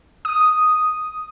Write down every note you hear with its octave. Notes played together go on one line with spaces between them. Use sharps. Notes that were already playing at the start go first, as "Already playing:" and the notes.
D#6